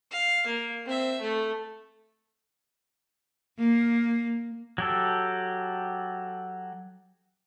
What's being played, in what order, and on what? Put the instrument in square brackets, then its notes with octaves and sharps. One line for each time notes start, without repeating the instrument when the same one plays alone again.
[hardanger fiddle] F5
A#3
C4 E5
A3
[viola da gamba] A#3
[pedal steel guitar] F#3 G4 A4